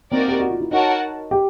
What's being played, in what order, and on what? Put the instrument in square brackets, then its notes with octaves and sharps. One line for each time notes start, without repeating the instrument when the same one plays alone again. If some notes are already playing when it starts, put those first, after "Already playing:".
[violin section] A#3 D#4 F#4 A#4 D5 [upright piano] C4
[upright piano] G4
F#4
F4
E4
[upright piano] D#4 [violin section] F#4 A#4 C#5 F#5 A5
[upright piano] G4